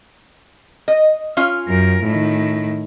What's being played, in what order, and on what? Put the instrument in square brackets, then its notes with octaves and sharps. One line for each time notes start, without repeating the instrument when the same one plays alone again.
[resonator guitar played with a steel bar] D#5
C#4 F4 F5
[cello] F#2 A#4
A2 D#3